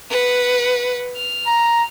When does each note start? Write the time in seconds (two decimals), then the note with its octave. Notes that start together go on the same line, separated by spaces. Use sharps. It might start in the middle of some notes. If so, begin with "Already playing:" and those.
0.10 B4 F#5
1.17 F6
1.47 A#5